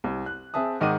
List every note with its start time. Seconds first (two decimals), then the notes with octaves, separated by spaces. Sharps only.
0.04 C2
0.26 F#6
0.54 C4 G#4 E5 A5 D#6
0.80 G#2 D#3 D#5 F#5 D6 D#7